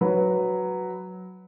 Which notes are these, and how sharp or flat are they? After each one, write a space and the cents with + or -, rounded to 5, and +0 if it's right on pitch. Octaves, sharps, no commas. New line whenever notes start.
F#3 +0 B4 +0